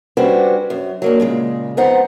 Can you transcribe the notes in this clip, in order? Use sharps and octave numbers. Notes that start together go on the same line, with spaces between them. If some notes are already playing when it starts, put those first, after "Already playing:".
G3 C#4 D4 F#4 B4 C5
F#2
F#3 A#3 D4
A#2 C#3 G#3
F2 B3 D#4 C5 F#5 A#5